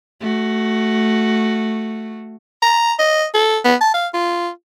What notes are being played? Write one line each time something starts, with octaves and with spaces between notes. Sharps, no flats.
A3 F#4
A#5
D#5
A4
B3
A5
F5
F4